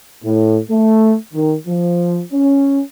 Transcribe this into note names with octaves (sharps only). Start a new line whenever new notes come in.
A2
A3
D#3
F3
C#4